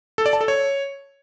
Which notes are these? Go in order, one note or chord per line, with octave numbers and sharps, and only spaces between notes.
A4
D5
A5
A4
C#5